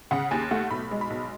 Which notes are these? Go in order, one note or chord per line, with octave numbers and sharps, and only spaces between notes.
C#3 F#5
D#2 G#5
A3 F#5
B1 B5
G#3
B5
B1